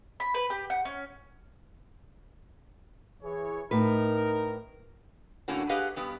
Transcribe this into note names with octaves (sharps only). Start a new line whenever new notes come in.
B5
B4
G4
F#5
C#4
E3 G#4 C#5
A2 D#4 A#4 B4
A2 D3 A#3 C#4 F#4
G4 G#4 B4 D#5 F5 F#5
G2 B2 B3 G4